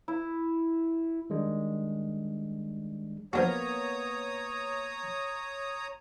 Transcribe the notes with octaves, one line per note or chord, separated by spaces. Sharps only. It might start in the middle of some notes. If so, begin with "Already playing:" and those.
E4
D#3 G3 G#3 D4
F3 A#3 B3 D4 F#4 C#5 A#5 D#6